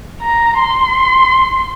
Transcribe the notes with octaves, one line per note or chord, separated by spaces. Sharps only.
A#5
C6